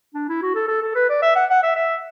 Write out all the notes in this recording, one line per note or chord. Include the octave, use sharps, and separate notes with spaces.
D4
E4
F#4
A4
A4
A4
B4
D5
E5
F#5
F#5
E5
E5